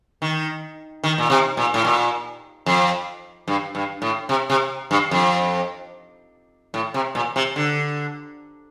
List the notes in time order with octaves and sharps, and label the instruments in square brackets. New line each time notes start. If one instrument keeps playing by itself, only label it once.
[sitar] D#3
D#3
A#2
C3
A#2
A2
A#2
F2
G2
G2
A2
C3
C3
G2
F2
A2
C3
A#2
C3
D3